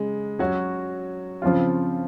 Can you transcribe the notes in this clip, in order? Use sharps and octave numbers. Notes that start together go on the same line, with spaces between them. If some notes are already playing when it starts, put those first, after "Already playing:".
Already playing: C#3 G#3
F#3 C#4 F#4
C#3 F3 C4 F4